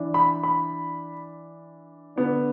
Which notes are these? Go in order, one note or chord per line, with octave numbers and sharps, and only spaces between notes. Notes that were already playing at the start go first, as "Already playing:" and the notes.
Already playing: E3 D4
B5
B5
D3 B3 D4